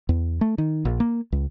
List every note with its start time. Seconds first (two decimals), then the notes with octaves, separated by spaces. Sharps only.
0.09 E2
0.41 A3
0.58 D#3
0.85 A#1
1.00 A#3
1.32 C#2